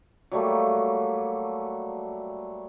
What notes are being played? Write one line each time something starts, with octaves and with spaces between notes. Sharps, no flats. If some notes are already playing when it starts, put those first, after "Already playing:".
F#3 G3 A3 A#3